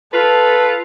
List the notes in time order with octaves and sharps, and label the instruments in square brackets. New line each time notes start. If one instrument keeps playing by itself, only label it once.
[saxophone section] F4 B4 [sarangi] A4